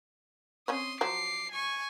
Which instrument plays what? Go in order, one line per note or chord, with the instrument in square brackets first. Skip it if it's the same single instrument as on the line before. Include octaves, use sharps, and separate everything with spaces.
[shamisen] C4 C#4 C#5 [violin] C6 D#6
[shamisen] F3 F#3 [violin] D6 C7
[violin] G#5 C#6